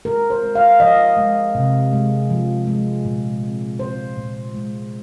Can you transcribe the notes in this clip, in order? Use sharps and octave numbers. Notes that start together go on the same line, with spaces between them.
G#3 A#4
C5
G#3
F5
F3 D#5
G#3
C3
G#3
F3
G#3
A#2
C4
G#3 C5
A#2
G#3